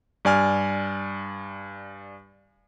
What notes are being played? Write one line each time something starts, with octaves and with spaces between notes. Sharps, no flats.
G2 D5 G#5 F6